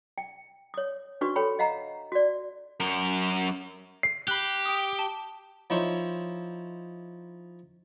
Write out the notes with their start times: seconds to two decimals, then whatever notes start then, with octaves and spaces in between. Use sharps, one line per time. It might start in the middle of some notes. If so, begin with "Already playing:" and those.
0.18 G5
0.74 C#5 D#6
1.21 D4 F#4 B4 C#6
1.36 A4 C#5 G5 B5
1.59 D#5 F5 F#5 A#5
2.12 F#4 D5
2.80 F#2 A#4
4.03 C7
4.28 G4 B5 F#6
4.66 G5 D#6
4.99 A5
5.70 F3 D#4 E4 C5 C#5